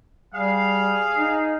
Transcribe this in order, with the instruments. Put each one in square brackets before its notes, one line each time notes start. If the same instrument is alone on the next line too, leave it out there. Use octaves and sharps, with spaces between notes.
[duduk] G3 [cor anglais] G#4 [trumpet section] F5
[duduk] D#4